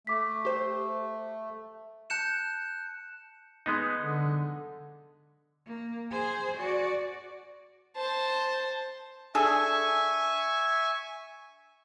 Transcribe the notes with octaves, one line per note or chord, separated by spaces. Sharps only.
A3 D6 B6
G4 C5
A5 F#6 G6 C#7 E7
G#3 B3 D#4
D3
A#3
G#4 C5
F#4 D5
C5 A5
D4 G#4 A4 E5 G#5 C#6